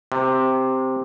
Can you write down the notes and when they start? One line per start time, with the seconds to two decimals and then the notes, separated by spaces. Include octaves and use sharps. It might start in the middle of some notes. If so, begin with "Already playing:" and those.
0.12 C3